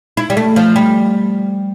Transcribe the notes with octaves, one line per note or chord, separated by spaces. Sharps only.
E4
G3
A3
F3
G3